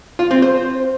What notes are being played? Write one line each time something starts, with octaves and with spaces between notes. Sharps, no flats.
F4
C4
C5